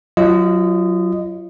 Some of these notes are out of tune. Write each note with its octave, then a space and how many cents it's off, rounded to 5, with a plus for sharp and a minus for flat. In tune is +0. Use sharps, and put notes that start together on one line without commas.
F#3 +0 F4 -40 D#5 -10